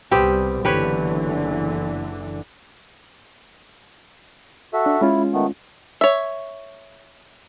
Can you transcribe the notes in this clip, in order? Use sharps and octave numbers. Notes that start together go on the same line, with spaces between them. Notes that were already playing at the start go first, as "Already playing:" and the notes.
C2 G3 B3 C4 G4
F#1 D3 E3 G4 B4 C#5
F#4 A4 E5
D4
G#3 C#4 E4 F4
D#3 A3 B3
C#5 E5